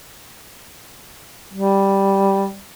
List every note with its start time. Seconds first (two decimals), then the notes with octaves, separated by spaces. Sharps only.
1.53 G3